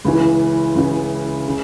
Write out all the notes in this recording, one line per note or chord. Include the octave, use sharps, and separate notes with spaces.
C#2 C#3 E3
C#2 C#3 E3
C#3